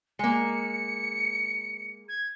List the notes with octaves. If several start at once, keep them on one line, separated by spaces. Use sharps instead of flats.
G#3 A#3 C#7
G#6